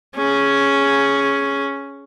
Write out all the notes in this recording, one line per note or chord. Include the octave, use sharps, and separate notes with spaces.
C#4 G#4